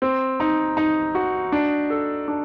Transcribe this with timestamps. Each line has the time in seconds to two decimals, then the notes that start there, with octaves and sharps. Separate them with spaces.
0.02 C4
0.40 D#4
0.77 D#4
1.15 F#4
1.52 D4
1.90 A4
2.28 D4